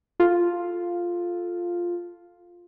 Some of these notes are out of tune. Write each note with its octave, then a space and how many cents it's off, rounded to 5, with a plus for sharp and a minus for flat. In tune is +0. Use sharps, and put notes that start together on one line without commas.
F4 +0 A4 -5